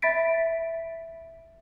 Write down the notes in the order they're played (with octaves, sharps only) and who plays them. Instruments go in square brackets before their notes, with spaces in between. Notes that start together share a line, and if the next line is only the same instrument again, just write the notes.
[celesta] E5 B5 A6 B6 D7